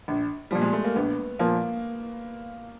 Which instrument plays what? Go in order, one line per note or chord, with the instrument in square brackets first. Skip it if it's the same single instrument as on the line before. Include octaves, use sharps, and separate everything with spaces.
[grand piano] A#1
[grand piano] A#2 F3 [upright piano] G3
[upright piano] G#3
A3
A#3
[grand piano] A#1 [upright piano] B3
[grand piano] A#2 F3 [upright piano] A#3